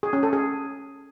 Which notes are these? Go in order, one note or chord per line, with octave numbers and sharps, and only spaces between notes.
G#4
C#4
A4
G#4